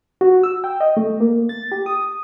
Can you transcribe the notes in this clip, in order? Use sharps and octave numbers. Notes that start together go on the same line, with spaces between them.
F#4
E6
G5
D#5
A3
A#3
A6
G4
D#6